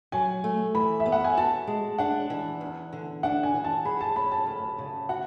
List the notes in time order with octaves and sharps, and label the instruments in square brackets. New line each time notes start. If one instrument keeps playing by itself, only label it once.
[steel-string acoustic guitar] F#3 [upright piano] G#5
[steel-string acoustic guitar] A3
[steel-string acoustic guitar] E3 [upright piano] B5
[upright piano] E5
[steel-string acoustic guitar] B3
[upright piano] F#5
G#5
[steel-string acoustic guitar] F#4 [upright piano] A5
[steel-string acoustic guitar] G#3
[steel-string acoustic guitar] D4 [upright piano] F#5
[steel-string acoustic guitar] E3
E2
D3
[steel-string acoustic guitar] D4 [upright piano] F#5
[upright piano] G#5
[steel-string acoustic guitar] E3
[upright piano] A5
[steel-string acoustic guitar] G#4 [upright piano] B5
[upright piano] A5
[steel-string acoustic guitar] C#4 [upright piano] B5
[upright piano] A5
[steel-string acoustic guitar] D2
C#3
[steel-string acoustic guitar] F#4 [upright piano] F#5